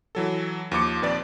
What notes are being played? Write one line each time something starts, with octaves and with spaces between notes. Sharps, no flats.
E3 F#3 A4
D#2 F3 D6 C#7
A#1 D#2 C4 B4 D5 A6